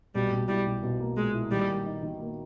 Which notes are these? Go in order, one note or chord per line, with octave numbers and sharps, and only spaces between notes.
B1 G3
B1
G3 E4
B1
B1
A#3
A#2 G#3
E4
D#3 G3
A#3
D#4
D#3
A#3